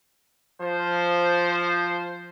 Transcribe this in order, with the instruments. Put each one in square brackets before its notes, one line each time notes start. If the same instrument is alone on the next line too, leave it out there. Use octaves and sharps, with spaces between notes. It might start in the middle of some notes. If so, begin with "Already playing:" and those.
[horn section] F3 C5